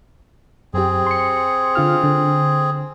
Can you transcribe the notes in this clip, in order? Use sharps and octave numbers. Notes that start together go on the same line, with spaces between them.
F#2 C4 G4 G#4
C6 C#7
D3 F4 F6
D3